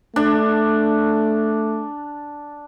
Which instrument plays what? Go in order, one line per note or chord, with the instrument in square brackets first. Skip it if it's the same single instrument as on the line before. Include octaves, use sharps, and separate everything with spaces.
[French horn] A3 [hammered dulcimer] D4